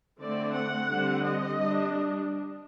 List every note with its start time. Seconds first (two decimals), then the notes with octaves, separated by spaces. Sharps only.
0.19 D3 A3 C4 D5
0.54 F#5
0.88 D3 G3 C4
1.24 D#5
1.59 G3 D4